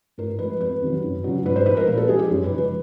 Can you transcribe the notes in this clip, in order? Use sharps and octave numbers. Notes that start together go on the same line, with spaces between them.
A2 A#4
F3 G#3 B4
F2 B4
C3 D#3 F#3
F#2
C#3 F#3
G#2 B4
C5
F3 G#3 B4
A#4
A#2 B4
A4
F3 G#3 G#4
G4
F#2
B4
C#3 F3 G#3
B4